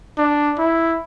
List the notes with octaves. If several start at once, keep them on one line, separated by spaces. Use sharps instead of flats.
D4
E4